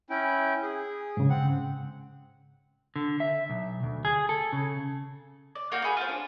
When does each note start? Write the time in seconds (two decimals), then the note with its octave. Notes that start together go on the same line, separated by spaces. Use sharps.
0.10 C#4 E4 G5
0.62 G#4
1.17 G#2 C#3
1.30 C4 F#5
2.96 D3
3.20 E5
3.49 B1
3.83 D2
4.05 G#4
4.29 A4
4.53 C#3
5.55 D5
5.72 A#3 F#4 F5 G5
5.84 F#4 G#4 B5
5.97 F4 C5
6.09 D4